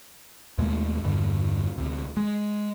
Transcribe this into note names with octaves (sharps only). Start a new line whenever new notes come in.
D#2 B2 G#3 A3
E1 G2 D3
D2 C3
G#3